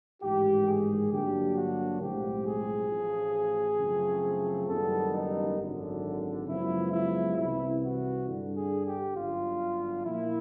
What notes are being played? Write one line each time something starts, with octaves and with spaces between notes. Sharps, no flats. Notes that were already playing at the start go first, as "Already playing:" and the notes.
A1 G#2 D#3 G#3 G4
G#4
G2 D3 F#3 A#3 D4 G4
F#4
B1 A2 F3 G#3 C4 G4
G#4
A1 A2 F3
F#2 C#3 F3 A3 C4
F#1 F#2 D#3 G3 B3 A4
D#4
G#1 F#2 D3
F#2 C#3 F3 G#3 B3 E4
E4
C2 C3 E3 E4
F#4
G2 D3 G3
G#4
G4
G1 F#2 D3 F4
A#2 F3 A#3 E4